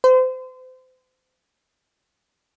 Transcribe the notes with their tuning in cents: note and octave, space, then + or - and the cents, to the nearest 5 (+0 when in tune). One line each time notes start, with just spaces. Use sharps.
C5 -35